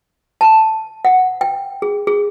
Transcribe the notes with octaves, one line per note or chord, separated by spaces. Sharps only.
A5
F#5
G5
G#4
G#4